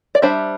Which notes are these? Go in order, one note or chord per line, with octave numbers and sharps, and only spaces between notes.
D5
G3 D4 C5 E5